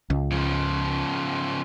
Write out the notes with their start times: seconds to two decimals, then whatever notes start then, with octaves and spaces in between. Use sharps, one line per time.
0.10 C#2
0.31 C#3 F3